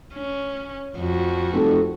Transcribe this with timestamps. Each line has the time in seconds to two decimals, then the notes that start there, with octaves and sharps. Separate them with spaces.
0.15 C#4
0.97 F2 F#4
1.53 F1 C4 A4